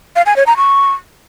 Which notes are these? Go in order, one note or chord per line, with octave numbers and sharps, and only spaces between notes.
F5
G#5
C#5
A#5
C#6